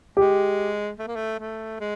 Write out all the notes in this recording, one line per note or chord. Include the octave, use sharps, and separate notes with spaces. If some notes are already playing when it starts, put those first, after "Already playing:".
G#3 G4
A3
A#3
A3
A3
G#3